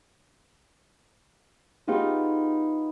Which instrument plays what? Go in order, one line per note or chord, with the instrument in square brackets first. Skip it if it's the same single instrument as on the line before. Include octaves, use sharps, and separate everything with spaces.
[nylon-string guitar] B3 D#4 F4 G4 G#4